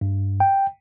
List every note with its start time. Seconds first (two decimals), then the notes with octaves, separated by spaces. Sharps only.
0.01 G2
0.40 G5